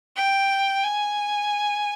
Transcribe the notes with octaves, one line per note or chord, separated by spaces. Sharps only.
G5
G#5